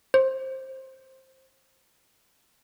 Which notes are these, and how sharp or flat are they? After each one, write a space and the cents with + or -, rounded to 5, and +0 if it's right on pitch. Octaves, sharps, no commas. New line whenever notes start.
C5 +15